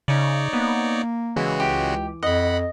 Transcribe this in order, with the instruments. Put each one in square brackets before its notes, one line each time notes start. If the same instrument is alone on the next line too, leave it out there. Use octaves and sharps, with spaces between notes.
[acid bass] C#3 [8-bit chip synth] D#4 C#5 D5
[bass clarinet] A#3 [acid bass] B3
[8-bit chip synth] C#3 G#3 F#4 [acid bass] E3
[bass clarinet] C#2 [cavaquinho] G4
[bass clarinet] F2 [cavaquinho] D#5 [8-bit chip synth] F#5 B5